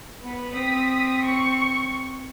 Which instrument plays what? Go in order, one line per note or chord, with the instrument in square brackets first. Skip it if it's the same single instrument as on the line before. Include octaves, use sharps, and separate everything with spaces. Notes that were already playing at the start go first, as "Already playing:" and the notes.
[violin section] B3 B4
[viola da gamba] C4 [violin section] D#6 B6
[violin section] C#6